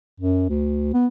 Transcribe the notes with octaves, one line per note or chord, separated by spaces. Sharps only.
F#2
D2
B3